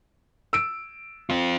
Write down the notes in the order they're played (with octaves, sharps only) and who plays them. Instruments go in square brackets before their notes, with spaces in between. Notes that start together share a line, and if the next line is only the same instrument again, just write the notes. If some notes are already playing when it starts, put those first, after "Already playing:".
[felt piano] E6 D7
[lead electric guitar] C4 F4